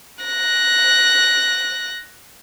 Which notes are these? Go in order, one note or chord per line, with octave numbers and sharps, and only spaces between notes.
F#6 A#6